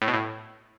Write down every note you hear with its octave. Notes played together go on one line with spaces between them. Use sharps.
A2
B2
A2